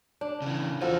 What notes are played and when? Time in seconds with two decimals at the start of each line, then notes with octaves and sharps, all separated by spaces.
0.21 D4
0.42 C#3 E3
0.81 E2 F3 F#4 A4